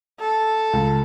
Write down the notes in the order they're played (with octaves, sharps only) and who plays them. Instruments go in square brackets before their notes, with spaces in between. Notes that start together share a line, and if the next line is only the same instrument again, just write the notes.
[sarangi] A4
[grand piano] C#2